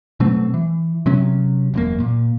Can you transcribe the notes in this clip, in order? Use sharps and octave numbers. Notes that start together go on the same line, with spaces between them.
B2 F#3 A3 C4
E3
C3 F#3 C#4
E1 F#2 A#3
A#2